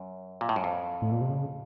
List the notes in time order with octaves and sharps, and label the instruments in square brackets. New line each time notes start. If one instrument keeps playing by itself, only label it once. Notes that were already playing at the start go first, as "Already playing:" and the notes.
Already playing: [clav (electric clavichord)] F#2
A#2
A2
F#2
F2
[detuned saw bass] A2
A#2
C3
C#3